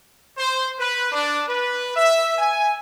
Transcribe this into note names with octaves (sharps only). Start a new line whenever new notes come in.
C5
B4
D4
B4
E5
G#5